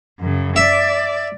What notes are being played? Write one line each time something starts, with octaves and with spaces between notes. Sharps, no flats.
F#2 C#3
D5 E5